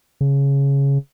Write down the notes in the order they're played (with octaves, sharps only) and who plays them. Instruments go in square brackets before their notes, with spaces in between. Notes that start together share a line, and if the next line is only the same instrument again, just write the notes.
[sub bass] C#3